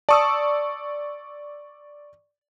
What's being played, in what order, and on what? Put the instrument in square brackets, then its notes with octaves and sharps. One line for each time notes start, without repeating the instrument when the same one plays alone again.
[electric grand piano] D5 C#6 E6 [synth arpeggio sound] A5 D#6